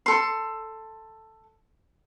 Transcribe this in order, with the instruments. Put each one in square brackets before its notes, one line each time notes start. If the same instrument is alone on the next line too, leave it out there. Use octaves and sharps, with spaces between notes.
[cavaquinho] A4 C6